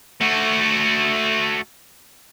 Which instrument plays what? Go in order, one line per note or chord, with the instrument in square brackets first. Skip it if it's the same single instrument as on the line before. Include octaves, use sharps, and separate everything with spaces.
[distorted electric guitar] A3 F#4